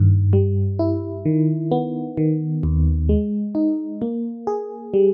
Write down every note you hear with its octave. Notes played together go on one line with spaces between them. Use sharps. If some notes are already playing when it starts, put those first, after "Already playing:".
Already playing: G2 D#3
G3
E4
D#3
B3
D#3
D#2
G#3
D#4
A#3
G#4
G3